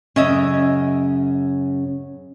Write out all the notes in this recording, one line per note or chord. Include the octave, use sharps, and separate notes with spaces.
F#2 C#3 C#4 D#5 E5